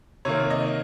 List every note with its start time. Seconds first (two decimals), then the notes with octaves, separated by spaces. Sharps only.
0.25 C3 D#3 A#3 C#5
0.50 D#5